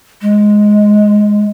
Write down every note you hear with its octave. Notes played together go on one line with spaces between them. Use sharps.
G#3